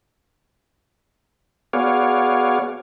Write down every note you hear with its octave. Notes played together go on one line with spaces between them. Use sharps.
B3 F#4 G#4 C#5 D5 F5